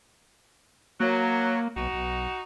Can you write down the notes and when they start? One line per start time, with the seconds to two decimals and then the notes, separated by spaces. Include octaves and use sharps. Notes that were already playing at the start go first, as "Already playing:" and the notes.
1.00 F#3 A#3
1.76 B1 D#4 F#4
1.94 B1